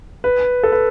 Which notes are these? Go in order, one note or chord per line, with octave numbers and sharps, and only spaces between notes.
B4
A4
B4